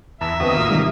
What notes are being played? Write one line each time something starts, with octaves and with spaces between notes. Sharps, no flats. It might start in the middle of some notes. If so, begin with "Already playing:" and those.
E2 E5 A5 A#5 E6
D2 B3 C4 F#4 D#5
A1 D#2 A#3 F4 D#6 E6
G#2 C3 D#3 G3